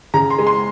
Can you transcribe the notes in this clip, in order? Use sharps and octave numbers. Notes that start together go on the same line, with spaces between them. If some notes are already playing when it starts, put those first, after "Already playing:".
C#3 A#5
C6
G#3
C6